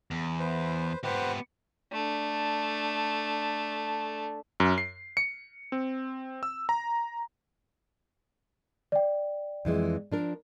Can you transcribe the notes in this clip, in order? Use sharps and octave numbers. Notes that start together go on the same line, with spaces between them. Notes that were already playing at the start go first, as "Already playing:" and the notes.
E2
B4 C5
B3 G4 B4 C5 F#5
A3 D4
F#2
C7
C#7
C4
E6
A#5
D5 G5
F2 E3 G#3
F3 D4 A#4